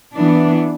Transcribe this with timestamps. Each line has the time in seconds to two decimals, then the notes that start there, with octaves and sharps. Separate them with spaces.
0.16 E3 B3 D4